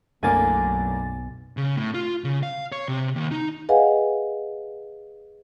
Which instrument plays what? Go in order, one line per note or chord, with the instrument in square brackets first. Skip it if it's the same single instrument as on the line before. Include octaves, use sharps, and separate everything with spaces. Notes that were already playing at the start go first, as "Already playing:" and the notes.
[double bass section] B1 [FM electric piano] F#2 A6 [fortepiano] A2 D3 A#3 [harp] G#5
[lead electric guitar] C#3
A2
F4
C#3
F5
C#5
C3
D#2
D#4
[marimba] G#4 B4 D#5 F5 F#5 G#5